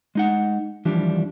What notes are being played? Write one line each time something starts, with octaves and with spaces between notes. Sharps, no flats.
G#3 D#4 F#5
D#2 E3 F3 G3 D4